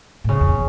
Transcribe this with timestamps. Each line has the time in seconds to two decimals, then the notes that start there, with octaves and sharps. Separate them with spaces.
0.24 A2
0.28 G#2 C#3
0.41 E2